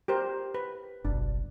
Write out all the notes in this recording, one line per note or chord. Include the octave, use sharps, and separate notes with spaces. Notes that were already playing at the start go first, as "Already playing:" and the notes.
G4 A#4 C5
B4
F#1 B1 D4